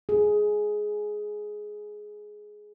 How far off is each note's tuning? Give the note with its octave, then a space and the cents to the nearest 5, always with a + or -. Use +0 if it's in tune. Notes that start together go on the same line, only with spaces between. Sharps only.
G#4 +10